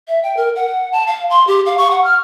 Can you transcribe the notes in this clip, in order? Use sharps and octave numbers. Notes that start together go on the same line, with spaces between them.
E5
G5
A#4
F#5
A5
F5
C6
G4
F5
C#6
F#5
F6